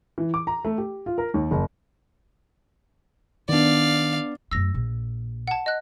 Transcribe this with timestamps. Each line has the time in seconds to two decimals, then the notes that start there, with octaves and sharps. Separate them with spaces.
0.18 E3
0.34 D6
0.47 A#5
0.65 A3
0.78 G4
1.06 F4
1.18 A#4
1.34 D#2
1.51 F#1
3.49 D#3 B3 D4 D5 F5
4.51 F#2 A3 E6 A#6
4.74 A#1
5.48 F#5 A5
5.66 D#5 F#6